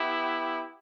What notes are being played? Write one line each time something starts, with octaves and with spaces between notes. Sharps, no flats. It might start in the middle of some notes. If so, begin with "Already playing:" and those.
Already playing: B3 E4 G4